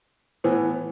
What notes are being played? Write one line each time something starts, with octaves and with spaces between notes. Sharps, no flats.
A2 E3 B3